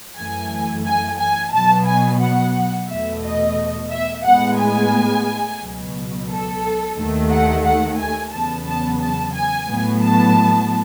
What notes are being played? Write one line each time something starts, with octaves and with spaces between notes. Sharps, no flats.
F#2 E3 A3 G#5
G#5
G#5
B2 F#3 B3 A5
G#5
F#5
E2 B2 A3 E5
D#5
E5
A2 G#3 B3 F#5
G#5
C#2 B2 F#3
A4
D#2 D#3 A3
F#5
F#5
G#5
E2 C#3 F#3 B3 A5
A5
A5
G#5
A2 F#3 B3
A5